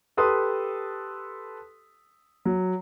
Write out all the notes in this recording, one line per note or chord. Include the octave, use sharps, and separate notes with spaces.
G4 A4 B4 C6 D#6
F#3